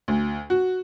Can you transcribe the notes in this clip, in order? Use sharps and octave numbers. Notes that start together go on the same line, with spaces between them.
D2
F#4